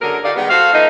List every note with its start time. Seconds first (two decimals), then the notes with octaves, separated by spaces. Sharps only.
0.01 F#2 D3 F#3 G#4 A#4
0.24 D#4 F4 G4 A4 D5 F5
0.36 D#3 G3 G#3 B3
0.50 F#4 A4 C5 F5
0.73 F3 A3 B3 D#4